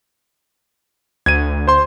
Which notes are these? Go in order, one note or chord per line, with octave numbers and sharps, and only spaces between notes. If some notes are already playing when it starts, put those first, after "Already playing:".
D2 G#6 D#7
C5 C6